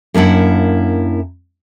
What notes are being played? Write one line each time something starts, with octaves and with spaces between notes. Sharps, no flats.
F#2 A#3 D4 E4 F#5